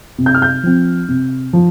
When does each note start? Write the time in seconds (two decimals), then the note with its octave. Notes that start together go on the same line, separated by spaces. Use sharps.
0.18 C3
0.26 G6
0.35 F6
0.42 G6
0.63 F3 C4
1.08 C3
1.53 F3